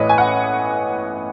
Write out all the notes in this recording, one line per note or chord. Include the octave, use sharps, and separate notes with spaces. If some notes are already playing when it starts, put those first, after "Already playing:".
Already playing: A1 A2 E3 B4 C#5 D#5
G#5
F#5